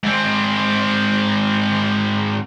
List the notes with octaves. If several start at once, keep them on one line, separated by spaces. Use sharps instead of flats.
G#2 C4